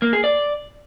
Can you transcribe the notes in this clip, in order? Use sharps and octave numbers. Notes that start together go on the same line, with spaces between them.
A#3
G#4
D5